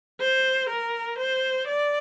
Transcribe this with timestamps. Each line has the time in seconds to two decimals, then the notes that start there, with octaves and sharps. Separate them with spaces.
0.20 C5
0.69 A#4
1.19 C5
1.68 D5